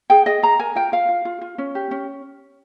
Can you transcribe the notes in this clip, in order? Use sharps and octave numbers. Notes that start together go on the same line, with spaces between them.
G#4 G5
G#4 D#5
G#4 A#5
A#4 G#5
F4 G5
F4 F5
F4
F4
F4
C#4
G4
C#4